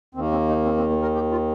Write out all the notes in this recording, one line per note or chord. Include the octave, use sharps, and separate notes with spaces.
D#2 D#3 A#3 C4
C4
D#4
C4
C4
A#3
A#4
G4
F4